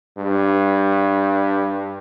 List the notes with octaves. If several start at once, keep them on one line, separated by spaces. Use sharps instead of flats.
G2